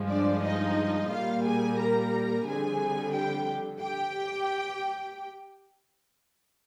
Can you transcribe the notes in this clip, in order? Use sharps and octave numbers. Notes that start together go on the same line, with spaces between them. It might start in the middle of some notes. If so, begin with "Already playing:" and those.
Already playing: G2 F3 G#3
D4 D5
D#4 D#5
A#2 G3 A#3 F4 F5
G#4 G#5
A#4 A#5
F2 D3 G3 G#4 G#5
G4 G5
G4 G5